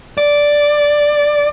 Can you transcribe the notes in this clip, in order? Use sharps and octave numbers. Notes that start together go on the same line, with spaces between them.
D5